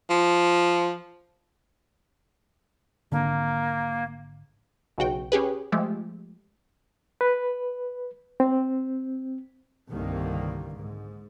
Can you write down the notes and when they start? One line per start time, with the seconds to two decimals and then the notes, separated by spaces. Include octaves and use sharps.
0.10 F3
3.12 G#1 D3 A#3
4.98 B1 C#3 F#4 G5
5.32 C#4 G4 G#4 B4
5.72 F3 G#3 A3 G4
7.21 B4
8.40 C4
9.90 C2 G2 D3 D#3 A#3
10.76 G#2